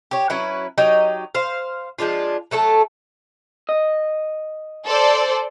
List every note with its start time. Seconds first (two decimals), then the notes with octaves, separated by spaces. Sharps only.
0.11 G4 C#5
0.30 F#3 C#4 E4 B4
0.78 F#3 D#4 G4 D#5
1.35 C5 F5
1.99 F3 G#3 D4 F4
2.51 F#3 A3 A4 A5
3.69 D#5
4.85 A4 C5 D5